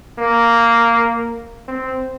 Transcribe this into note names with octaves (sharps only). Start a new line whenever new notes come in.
A#3
C4